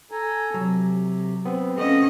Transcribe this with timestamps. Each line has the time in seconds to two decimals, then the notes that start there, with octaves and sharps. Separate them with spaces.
0.11 A4 G#5 A#5
0.54 C3 F#3
1.45 B3 C4
1.78 F3 A3 C#4 D#5